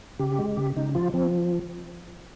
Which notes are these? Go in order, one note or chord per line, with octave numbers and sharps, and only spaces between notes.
C#3 G4
G#3
C#3 G4
C#3 D#4
F3 F4
F3 C4